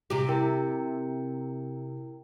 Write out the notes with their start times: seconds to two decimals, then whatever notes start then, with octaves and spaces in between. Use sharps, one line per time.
0.10 C3 G4
0.28 E4 A#4 G5